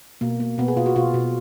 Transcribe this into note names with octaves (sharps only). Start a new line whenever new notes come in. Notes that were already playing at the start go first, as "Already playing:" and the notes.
B2 A#3
A#3
B2 B3
G#4
B2 F4
F#4
B2 F4
B2